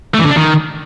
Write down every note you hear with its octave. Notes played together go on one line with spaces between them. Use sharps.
A3
E3
D3
D4
D#3